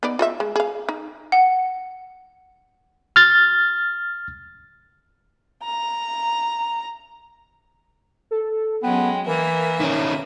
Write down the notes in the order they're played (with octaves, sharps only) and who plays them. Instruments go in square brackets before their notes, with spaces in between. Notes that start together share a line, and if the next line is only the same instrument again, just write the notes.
[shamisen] B3 D#4 D5
F4 D#5 E5
G#3
G#4 F5
D#4
[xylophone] F#5
[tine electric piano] F6 A6
[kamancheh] A#5
[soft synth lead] A4
[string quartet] F#3 G#3 C#4 [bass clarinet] B3 [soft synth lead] G5
[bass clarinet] E3 [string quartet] A#3 E5 [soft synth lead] A#4
[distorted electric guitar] D#3 C#4